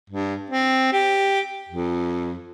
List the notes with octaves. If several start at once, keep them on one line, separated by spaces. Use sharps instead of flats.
G2
C4
G4
F2